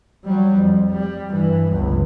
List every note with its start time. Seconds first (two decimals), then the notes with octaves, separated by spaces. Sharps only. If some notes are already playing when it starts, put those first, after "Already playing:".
0.25 F#3 G3
0.55 F2
0.91 G3
1.30 G2 E3
1.72 G1 C#2